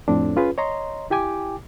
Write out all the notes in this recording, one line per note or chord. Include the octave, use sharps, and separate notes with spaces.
F2 A2 C4 D4
C#4 F4 G#4 B4
C#5 D#5 A#5 C6
E4 G4 G5 G#5 D6